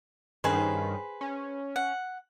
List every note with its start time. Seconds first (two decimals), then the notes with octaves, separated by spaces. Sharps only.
0.44 G2 D#3 C#4 G#4 B4 C5
1.21 C#4
1.76 F#5